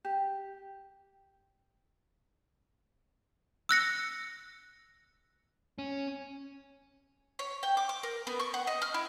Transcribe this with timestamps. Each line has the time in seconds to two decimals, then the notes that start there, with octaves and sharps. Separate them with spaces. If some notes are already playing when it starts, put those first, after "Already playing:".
0.05 G4
3.69 E6 F#6 A#6 C#7
5.78 C#4
7.39 C#5
7.63 G5
7.77 D6
7.89 D6
8.03 A#4
8.27 B3
8.39 C#6
8.54 F#5
8.67 D#5
8.82 F6
8.94 E4